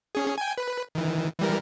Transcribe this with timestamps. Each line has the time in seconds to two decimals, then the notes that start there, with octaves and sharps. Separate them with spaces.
0.15 C#4 G#4
0.38 G5 G#5
0.58 B4
0.95 D#3 E3
1.40 E3 G3 A#4